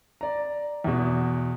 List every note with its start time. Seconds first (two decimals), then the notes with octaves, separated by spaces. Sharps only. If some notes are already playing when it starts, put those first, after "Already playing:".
0.21 D5 A#5
0.84 E2 B2